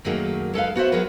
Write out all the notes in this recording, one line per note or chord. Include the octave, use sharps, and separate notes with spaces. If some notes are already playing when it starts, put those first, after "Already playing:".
F#2 D#3 F#3 A3 A#3 G#4
G#3 A4 B4 F5
B3 F#4 C5 E5
F#3 F#4 G#4 A#4 B4